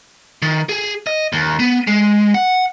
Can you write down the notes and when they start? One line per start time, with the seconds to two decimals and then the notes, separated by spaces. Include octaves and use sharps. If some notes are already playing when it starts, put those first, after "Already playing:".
0.42 D#3
0.69 G#4
1.07 D#5
1.33 D#2
1.60 B3
1.87 G#3
2.34 F#5